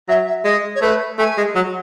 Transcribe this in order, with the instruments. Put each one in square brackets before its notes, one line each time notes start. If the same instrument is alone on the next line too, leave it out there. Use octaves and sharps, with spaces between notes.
[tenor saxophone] F#3 [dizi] E5
[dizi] E5
[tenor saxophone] G#3 [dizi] D#5
[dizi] C#5
[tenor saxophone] A3 [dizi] B4
[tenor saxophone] A3 [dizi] G#5
[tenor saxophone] G#3
F#3